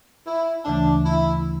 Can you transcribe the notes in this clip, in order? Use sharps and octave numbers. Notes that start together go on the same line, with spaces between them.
E4
D2 C#3 E3 A3 D4
E4